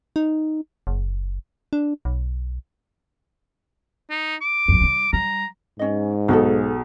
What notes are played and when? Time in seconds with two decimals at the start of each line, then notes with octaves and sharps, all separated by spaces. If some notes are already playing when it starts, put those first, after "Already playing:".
0.16 D#4
0.87 F#1
1.73 D4
2.05 B1
4.10 D#4
4.42 D6
4.68 A#1 F#2
4.81 G3 D#4
5.13 G3 A#5
5.79 G#2 C#4 D#5
6.28 B1 F#4 G#4 A4